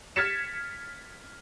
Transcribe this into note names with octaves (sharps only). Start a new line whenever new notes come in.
F6 G#6 A6 B6 C#7 E7